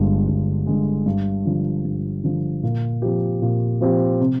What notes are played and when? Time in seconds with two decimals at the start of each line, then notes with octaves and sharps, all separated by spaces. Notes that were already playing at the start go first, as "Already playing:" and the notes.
Already playing: G1 G2 D3 G#3
0.28 G1
0.66 G2 D3 G#3
1.06 G2
1.45 D3 F3
1.84 G2
2.24 D3 F3
2.63 A#2
3.02 F3 C4 G4
3.42 A#2
3.81 F3 C4 G4
4.20 C3